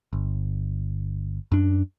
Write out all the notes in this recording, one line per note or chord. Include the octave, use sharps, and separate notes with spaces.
G1
F#2 D4